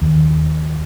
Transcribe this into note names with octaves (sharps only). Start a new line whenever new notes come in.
D#2